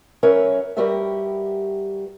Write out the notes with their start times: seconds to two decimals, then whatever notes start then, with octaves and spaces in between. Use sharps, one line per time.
0.23 F#3 C#4 A#4 B4 C#5 E5
0.77 G3 F#4 G4 A#4 B4 E5